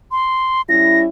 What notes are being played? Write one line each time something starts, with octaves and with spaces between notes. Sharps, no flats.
C6
G3 C#4 E4 A#6